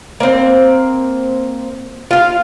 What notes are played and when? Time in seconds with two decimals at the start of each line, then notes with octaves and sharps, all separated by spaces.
0.20 A#3 C4
2.11 F4 F5